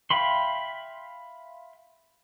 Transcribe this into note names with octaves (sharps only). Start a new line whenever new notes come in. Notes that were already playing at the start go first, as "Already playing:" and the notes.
E5 F5 G5 B5 C6